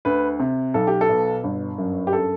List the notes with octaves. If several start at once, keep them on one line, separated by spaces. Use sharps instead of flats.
D2 B4
C3
B1 A4
G4
A4
B2
G1
F#2
G4
A4